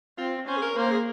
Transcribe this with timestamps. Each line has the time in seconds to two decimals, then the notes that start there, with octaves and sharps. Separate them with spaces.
0.18 C4 F4
0.47 C#4 C5
0.57 G#4
0.62 A#4
0.77 A#3 C5
0.91 G#4